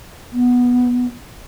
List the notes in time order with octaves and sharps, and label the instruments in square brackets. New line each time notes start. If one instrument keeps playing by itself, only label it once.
[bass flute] B3